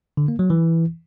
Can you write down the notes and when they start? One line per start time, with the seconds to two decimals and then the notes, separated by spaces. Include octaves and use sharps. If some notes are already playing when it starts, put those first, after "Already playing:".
0.17 D3
0.28 A#3
0.39 F#3
0.50 E3